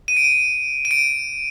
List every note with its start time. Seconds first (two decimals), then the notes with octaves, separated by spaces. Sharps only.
0.08 D#7
0.17 D7
0.24 D#7
0.85 D#7
0.91 D7